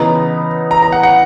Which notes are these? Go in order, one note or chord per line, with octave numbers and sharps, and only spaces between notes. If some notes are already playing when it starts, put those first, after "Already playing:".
Already playing: C#3 E3 B3 D#4 A#5
A#5
A#5
F#5
F#5